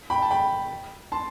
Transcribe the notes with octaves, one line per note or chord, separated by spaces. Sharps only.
G5 B5
A5
G5 B5
A5 C6